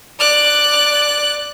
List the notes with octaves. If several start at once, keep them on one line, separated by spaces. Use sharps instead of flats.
D5 F#6